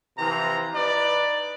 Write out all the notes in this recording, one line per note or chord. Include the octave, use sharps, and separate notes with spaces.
C3 E3 F3 A#5
D#4 B4 D5